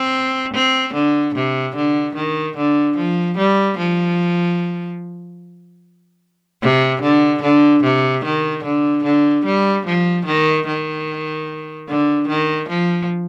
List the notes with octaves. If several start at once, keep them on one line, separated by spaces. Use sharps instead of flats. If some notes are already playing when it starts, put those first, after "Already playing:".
Already playing: C4
C4
D3
C3
D3
D#3
D3
F3
G3
F3
C3
D3
D3
C3
D#3
D3
D3
G3
F3
D#3
D#3
D3
D#3
F3